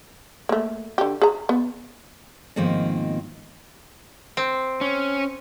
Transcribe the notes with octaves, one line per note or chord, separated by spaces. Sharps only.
A3 A#3
D3 G4
G#4 A#5
B3
G#2 B2 D#3 F3 A#3 C4
C4
C#4